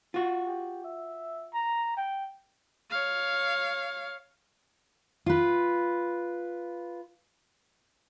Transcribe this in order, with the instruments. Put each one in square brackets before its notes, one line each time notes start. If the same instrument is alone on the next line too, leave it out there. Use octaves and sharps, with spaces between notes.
[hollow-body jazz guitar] F4 F#4
[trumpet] G4
E5
A#5
G5
[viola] C#5 F5
[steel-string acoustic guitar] F4 B4